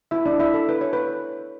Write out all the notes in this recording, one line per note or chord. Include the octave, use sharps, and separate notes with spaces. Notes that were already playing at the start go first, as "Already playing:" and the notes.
E4 E5
D4 D5
E4 E5
A4
B4
C#5
B4